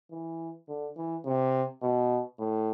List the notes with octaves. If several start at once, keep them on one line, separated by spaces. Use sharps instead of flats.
E3
D3
E3
C3
B2
A2